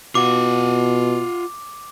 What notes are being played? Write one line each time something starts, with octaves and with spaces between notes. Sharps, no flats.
B2 F4 F#5 D6